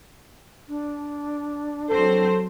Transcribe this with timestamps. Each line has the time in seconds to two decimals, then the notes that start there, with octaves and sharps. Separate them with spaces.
0.68 D4
1.90 F#3 C4 A4 C5